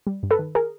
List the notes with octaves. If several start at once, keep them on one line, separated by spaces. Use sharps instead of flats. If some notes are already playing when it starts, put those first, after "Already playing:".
G3
G2
A4 B4
D#3
G#4 A#4